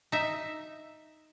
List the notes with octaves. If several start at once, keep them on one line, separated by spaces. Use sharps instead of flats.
D#4 E5